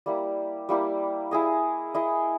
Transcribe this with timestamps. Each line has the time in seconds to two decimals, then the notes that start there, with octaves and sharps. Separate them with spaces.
0.06 G3 A#3 E4 G4
0.69 G3 A#3 E4 G4
1.31 E4 G#4 D#5
1.94 E4 G#4 D#5